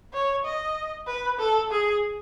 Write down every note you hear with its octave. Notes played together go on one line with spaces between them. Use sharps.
C#5
D#5
B4
A4
G#4